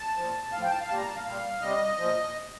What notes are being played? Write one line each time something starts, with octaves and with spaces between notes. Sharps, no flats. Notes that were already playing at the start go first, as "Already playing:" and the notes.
Already playing: A5
A#2 F3
A2 F5
F3 G5
A5
F5
A#2 G3 A5
A#5
A5
F5
A#2 G3
C3 G3 D#5
A#2 F3